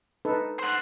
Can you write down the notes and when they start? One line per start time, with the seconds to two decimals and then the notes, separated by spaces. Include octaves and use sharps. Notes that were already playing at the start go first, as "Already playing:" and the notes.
0.25 D#4 A4 B4
0.59 C5 F#5